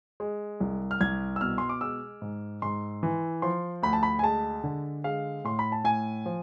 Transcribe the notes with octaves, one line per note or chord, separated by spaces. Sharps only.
G#3
C2
F6
C2 G#6
E6
B2 F6
C6
D6
G#3 E6
G#2
G#2 C6
E3
F3 C6
D2 B5
A5
B5
G#5
G#3 A5
D3
G#3 F5
A2 C6
B5
A5
A2 G#5
F3